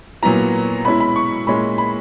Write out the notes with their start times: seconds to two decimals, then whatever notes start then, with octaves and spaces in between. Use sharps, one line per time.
0.22 A#2 F#3 B3 E4 A#5
0.85 B2 G#3 C#4 E4 B5
1.00 B5
1.16 C#6
1.47 A#2 G#3 C#4 E4 B5
1.78 B5